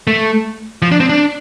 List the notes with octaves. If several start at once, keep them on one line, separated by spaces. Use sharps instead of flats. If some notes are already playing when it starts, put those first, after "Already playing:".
A3
F3
D4
C4
D4